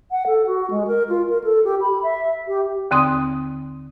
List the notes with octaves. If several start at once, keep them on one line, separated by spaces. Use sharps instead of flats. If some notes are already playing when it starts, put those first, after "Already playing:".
F#5
A4
F#4
G#3
A#4
F4
A#4
A4
G4
B5
E5
G4
D#2 D3 C4 C6 D#6